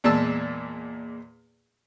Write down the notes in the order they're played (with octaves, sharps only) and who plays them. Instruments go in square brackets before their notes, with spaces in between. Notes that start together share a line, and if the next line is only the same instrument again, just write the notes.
[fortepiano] E2 A#2 G#3 A5 E6